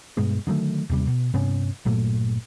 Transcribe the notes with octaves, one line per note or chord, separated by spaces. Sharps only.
G2 B2 G#3 B3
D3 D#3 F#3 A3
D#2 C3 G3
B2
G2 C3 B3 C#4
G1 A#2 F#3 A3